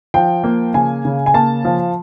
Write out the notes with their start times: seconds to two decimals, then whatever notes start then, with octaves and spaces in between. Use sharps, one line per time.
0.14 F3 G5
0.44 A#3
0.74 C#3 G#5
1.05 C#3
1.26 G#5
1.34 A#3 A5
1.65 F3